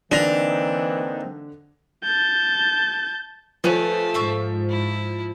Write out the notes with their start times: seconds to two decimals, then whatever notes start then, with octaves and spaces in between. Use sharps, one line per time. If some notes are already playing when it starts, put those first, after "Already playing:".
0.12 D3 E3 A#3 C4 D4 D#4 A#6 F7
2.04 A5 G6
3.64 F3 A3 B4 C#5 G#5
4.14 G#2 E5 F5 C#6
4.69 E4